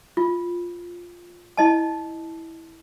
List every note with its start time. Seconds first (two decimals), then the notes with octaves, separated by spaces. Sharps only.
0.17 F4
1.57 E4 D#5 A5